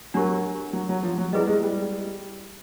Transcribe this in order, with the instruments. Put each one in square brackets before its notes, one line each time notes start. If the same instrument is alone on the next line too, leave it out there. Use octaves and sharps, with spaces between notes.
[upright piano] F#3 [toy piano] D4 G4 A#4
[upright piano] F#3
F#3
F3
F#3
[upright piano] G3 [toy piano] E4 G#4 B4 D#5
[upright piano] G#3
G3